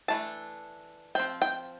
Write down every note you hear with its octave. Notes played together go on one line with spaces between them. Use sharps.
E3 A3 D4 A5
F3 C4 G5
G5